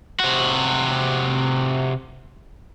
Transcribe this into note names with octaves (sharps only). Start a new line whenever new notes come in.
C3 F#4